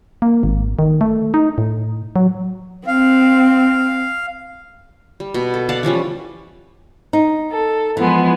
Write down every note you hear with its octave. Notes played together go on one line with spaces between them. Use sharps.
A#3
G#1
D#3
A3
D#4
A2
F#3
C4 F5
G3
B2
A4
D5 F5 F#5 A5
E3 F3 G3 C#4
D#4
A4
E3 F3 G#3 B3